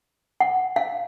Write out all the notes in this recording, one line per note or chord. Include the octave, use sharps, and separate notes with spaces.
F#5
F5